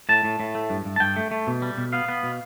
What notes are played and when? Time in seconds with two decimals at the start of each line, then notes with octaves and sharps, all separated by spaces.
0.09 A2 A5
0.24 A2
0.40 A2
0.55 A3
0.70 G2
0.85 G2
0.96 A5
1.00 G2 G5
1.16 A3
1.31 A3
1.47 B2
1.62 G3
1.78 B2
1.93 B3 F5
2.08 B3
2.23 B2